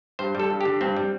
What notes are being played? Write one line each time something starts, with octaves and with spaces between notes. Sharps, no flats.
G2 C5
G3 A4
G2
D3 G4
G2 C4
G3